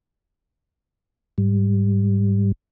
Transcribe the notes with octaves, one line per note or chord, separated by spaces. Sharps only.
G#2 G3